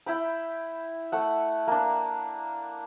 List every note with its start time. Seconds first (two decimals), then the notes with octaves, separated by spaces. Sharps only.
0.06 E4 G5 B5
1.12 A3 F#5
1.67 A#3 D4